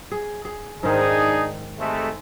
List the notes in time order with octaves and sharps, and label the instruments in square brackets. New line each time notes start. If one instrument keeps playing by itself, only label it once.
[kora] G#4
G#4
[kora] G#2 D#3 [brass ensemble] D4 D#4 G#4
[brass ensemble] C3 G#3 A3